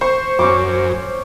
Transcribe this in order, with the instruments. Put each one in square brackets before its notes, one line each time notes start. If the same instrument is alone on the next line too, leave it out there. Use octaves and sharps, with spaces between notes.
[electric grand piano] C5 [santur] C#6
[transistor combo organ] F#2 [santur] C#4 C#6 D6